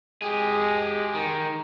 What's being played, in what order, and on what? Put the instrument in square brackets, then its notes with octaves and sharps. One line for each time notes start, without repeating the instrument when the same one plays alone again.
[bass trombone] G#3 [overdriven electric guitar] G4 G#4
[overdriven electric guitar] D#3